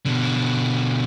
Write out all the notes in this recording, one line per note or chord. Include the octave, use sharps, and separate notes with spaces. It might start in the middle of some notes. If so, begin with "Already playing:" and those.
B2 D3